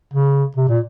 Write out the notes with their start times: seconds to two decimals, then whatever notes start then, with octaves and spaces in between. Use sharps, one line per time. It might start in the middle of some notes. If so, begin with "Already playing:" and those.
0.13 C#3
0.56 C3
0.69 A#2